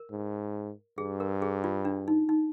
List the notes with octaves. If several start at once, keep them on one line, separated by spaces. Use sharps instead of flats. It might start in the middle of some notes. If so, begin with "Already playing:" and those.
Already playing: A#4
G#2
G2 G#4
A#4
G#4
F4
D4
D#4
D#4